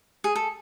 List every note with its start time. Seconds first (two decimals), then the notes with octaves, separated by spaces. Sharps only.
0.24 G#4
0.36 A4